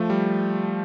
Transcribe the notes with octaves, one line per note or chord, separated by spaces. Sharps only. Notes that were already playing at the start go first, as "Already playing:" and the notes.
Already playing: F3 A3
G3